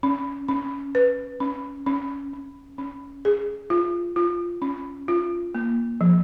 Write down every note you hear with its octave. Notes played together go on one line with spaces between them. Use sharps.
C#4
C#4
B4
C#4
C#4
C#4
C#4
G#4
F4
F4
C#4
F4
A#3
F3